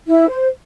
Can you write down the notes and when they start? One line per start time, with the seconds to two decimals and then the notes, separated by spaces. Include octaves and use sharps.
0.08 E4
0.29 C5